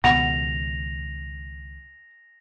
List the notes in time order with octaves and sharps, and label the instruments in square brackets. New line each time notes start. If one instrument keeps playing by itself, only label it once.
[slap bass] C#2 B2 D#3 [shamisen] B3 F#5 [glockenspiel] A#6 F7